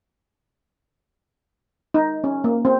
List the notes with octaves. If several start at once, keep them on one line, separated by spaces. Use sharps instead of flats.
D#4
C#4
A#3
C4